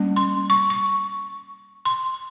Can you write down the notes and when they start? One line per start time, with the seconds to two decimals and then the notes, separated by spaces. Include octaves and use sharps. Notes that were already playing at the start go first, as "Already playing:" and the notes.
Already playing: G3 A#3 C#4
0.16 C6
0.50 C#6
0.70 C#6
1.85 C6